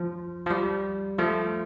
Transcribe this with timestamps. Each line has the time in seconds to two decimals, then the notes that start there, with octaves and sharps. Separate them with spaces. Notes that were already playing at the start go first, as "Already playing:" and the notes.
Already playing: F3
0.46 F3
0.51 G3
1.19 F3 A3